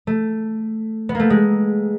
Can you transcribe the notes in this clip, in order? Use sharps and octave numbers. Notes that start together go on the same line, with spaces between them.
A3
B3
A3 A#3
G#3